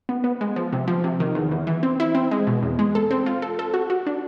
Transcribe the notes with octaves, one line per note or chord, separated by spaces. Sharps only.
B3
B3
G#3
F3
C3
F3
C3
D#3
E2
E2
E3
C4
E4
C4
G#3
B2
E2
G#3
A4
C4
F4
A4
A4
F#4
F#4
D4